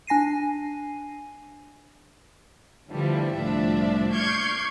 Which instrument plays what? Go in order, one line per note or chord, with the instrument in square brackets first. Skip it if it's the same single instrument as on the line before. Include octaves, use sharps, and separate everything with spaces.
[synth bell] D4 G#5 A#6 C7 D#7
[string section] D3 E3 F3 G3 A3
C2 A2 F3 D4 E5
C#6 D6 F6 G6 G#6 C7